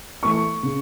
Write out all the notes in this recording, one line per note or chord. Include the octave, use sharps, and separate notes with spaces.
E3 A3 C#6
C#3